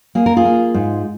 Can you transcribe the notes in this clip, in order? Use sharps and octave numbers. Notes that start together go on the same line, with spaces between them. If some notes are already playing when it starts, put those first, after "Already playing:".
A#3 G#4
A#4
F4 G#4
A#3
G#2